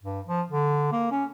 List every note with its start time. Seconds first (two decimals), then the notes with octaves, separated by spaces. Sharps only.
0.03 G2
0.27 F3
0.51 D3
0.92 A#3
1.11 C#4